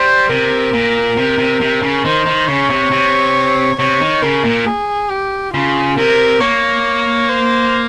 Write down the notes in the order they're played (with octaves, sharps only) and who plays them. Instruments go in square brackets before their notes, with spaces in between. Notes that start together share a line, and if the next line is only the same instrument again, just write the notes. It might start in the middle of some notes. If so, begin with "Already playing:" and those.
Already playing: [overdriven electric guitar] G3 [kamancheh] C5
[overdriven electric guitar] C3 [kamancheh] A#4
[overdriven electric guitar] A#2
C3
C3
C3
C#3
[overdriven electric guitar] D#3 [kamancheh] C5
[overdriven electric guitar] D#3
[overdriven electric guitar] C#3 [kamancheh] C#5
[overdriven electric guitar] C3
C3
[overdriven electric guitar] C3 [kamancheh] C#5
[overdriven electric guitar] D#3
[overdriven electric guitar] C#3 [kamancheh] A#4
[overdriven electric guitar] A#2
[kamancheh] G#4
G4
[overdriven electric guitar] C#3 [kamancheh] F4
[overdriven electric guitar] C3 [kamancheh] A#4
[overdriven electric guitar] A#3 [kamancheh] C#5
[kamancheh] C5